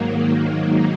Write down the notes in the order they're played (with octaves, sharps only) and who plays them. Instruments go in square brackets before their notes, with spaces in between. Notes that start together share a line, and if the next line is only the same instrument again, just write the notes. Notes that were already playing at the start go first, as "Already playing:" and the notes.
Already playing: [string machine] G#2 D#3 F#3 A#3